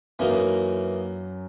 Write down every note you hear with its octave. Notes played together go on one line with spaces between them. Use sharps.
F#2 E3 F#3 A#3 D#4